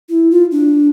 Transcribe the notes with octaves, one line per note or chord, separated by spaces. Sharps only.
E4
F4
D4